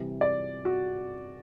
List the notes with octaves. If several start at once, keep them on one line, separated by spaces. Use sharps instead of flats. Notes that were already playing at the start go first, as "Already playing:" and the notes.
Already playing: C3 E3 G3
D5
F#4